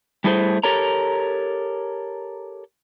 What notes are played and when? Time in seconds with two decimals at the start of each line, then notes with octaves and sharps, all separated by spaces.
0.24 G3 A3 E4 G#4 B4 C5
0.64 G4 A4 A#4 C#5 A#5